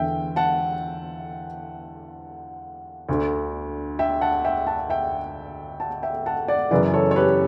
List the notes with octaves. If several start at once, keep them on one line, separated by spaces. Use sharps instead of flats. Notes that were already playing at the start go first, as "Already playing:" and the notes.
Already playing: E2 D3 E5 G5
F#5 A5
D2 D3
E5 G5
F#5 A5
E5 G5
F#5 A5
E5 G5
F#5 A5
E5 G5
F#5 A5
D5 F#5
F#2 C#3 E3 B4 D5
A4 C#5
C#5
G4 B4